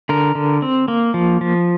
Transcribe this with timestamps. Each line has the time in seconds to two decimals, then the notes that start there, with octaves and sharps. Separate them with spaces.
0.09 D3 A#4
0.35 D3
0.62 C4
0.88 A#3
1.14 F3
1.41 F3